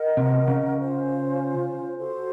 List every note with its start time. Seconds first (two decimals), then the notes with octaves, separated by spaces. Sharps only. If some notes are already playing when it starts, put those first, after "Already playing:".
Already playing: A#4 D#5 F#5
0.17 C3
0.48 C#3
0.78 C#4 F4 C5
1.97 F#4 A4 C5